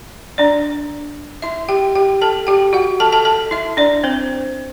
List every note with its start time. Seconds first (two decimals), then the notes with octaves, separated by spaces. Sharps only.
0.38 D4 D5
1.42 E4 E5
1.69 G4 G5
1.95 G4 G5
2.21 A4 A5
2.47 G4 G5
2.73 F#4 F#5
3.00 A4 A5
3.12 A4 A5
3.25 A4 A5
3.51 E4 E5
3.77 D4 D5
4.04 C4 C5